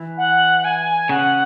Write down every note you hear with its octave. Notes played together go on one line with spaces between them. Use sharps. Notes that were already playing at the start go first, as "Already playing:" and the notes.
Already playing: E3
F#5
G#5
C#3 F#5